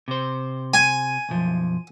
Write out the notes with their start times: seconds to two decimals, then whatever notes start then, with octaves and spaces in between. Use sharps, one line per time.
0.08 C3 C5
0.74 G#5
1.29 B1 F#2 F3